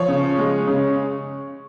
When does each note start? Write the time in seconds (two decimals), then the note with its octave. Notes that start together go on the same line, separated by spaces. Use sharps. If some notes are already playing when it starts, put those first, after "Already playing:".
Already playing: F3 C#5
0.08 C#3
0.38 G#3
0.68 C#3